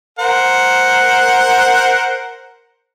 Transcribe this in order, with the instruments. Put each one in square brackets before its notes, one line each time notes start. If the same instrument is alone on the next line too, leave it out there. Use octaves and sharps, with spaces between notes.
[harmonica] A#4 C5 F#5